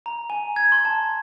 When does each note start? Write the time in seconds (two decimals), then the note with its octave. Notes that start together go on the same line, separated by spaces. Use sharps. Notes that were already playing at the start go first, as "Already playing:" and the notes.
0.06 A#5
0.30 G#5
0.56 G#6
0.72 C6
0.85 A5